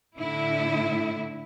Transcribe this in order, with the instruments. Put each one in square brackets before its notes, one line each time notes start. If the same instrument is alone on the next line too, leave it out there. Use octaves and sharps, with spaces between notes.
[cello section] A2 D3 E4